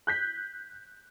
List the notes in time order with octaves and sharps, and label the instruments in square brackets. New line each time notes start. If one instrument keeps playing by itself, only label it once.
[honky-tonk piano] F#6 G6 B6